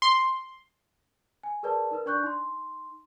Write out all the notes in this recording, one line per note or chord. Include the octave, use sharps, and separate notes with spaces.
C6
G#5
G#4 A#4 B4 D5 A5
D#4 A#4 B4
D4 D5 C#6 F#6 G6
D#4 C6